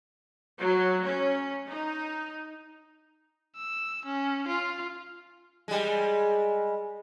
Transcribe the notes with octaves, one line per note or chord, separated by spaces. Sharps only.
F#3
C#4
D#4
E6
C#4
F4
G3 G#3